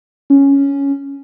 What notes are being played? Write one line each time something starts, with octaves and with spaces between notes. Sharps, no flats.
C#4